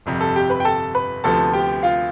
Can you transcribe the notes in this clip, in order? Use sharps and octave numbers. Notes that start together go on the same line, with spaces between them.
G1 F2 C3 G3
A4
G4 G5
B4 B5
G5
A4 A5
B4 B5
D2 C3 F3 B3 A4 A5
G4 G5
F4 F5